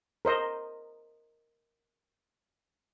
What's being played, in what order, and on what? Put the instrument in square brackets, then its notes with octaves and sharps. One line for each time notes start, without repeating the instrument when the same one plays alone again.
[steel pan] A#4 C5 D#5